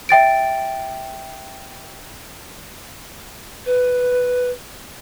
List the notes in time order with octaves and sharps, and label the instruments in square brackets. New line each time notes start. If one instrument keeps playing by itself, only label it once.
[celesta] E5 G5 A6 D7
[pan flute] B4